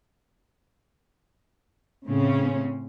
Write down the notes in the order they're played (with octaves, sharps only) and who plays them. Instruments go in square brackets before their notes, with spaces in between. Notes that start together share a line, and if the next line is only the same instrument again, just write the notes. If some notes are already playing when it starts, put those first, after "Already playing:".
[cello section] A2 C#3 C4 C#4